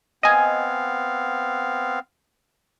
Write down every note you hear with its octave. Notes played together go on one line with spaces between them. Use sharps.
B3 C4 D#5 F5 G#5